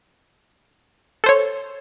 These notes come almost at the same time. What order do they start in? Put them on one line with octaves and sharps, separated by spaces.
A4 C5 C#5